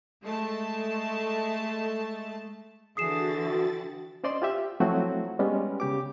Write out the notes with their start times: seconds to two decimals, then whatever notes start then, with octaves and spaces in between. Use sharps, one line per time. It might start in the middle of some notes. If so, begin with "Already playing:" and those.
0.23 G#3 A3 A5
2.97 D3 E3 F#4 G#4 D#6 A6 C7 E7
3.50 G5
4.24 C#4 C5 D5 D#5 C6
4.42 F4 G4 E5
4.80 F3 F#3 A3 C4 E4 F#4
5.39 G3 G#3 B3 C#4
5.80 C#3 G4 D6